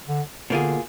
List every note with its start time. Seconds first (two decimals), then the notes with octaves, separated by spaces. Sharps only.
0.09 D3
0.50 B2 D3 A#3 F4 G#4